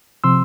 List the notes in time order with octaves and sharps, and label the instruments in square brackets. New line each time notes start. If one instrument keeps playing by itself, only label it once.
[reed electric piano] C3 F3 C4 C6 E6